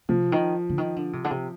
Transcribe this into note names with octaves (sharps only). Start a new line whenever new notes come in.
C3 F3
D#3
D3
D#3
D3
C3
D3
C3